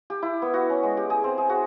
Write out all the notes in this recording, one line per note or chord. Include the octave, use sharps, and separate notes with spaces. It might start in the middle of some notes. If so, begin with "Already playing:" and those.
G4
E4
B3
F#4
C#4
G#3
G4
G#4
C4
G#4
F#4